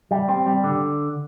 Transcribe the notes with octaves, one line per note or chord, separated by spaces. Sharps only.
G3
C4
G3
D3